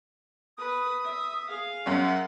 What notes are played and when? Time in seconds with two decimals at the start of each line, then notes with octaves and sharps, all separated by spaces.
0.58 B4 D#6
1.04 E5
1.48 G#4 F5
1.86 F#2 C#4 F#5